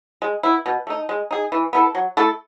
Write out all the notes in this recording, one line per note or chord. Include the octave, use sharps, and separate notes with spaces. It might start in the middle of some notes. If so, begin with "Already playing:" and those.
G#3
B3 E4
B2
A3 D#4
G#3
D#4 G#4
E3
B3 E4 A4
F#3
A3 E4 A4